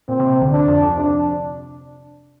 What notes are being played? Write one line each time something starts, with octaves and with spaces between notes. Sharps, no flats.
A#2 C4
C3
C3
D2 D3
D4
F2 F3
F2 F3
C3 D4